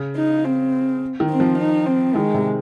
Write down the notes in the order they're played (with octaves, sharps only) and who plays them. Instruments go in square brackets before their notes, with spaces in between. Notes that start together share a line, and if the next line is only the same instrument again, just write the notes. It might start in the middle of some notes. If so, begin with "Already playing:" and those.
Already playing: [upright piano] C#3
[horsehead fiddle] D#4
C4
[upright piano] D#3
[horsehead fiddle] C4
[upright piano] F3
[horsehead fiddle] D#4
C4
[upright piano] D#3 [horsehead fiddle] G#3
[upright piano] C3